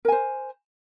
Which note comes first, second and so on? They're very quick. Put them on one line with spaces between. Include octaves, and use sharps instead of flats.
A#4 G#5 C5